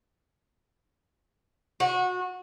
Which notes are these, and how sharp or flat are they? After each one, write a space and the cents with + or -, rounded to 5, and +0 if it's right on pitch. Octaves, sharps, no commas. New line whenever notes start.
F#4 -25